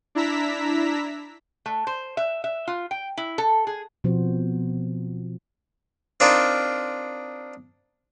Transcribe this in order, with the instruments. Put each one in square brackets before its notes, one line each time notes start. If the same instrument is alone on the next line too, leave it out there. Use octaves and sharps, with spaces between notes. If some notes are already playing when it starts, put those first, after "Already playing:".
[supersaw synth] D4 E4 A#5 E6 B6
[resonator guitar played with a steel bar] A3
C5
E5
E5
F4
G5
E4
A4
G#4
[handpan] B2 F3 B3 C4 F#4 C5
[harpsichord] C4 D4 D#4 F4 A#4